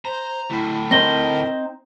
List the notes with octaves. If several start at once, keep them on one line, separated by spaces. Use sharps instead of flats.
C5 A#5
D2 A2 E4
C4 D#4 A#4 C5 A#6 G7